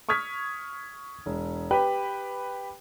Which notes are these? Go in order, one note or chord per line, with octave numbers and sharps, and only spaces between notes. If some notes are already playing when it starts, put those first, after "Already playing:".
C#6 D#6 F6 G#6 B6
E1
G4 B4 G5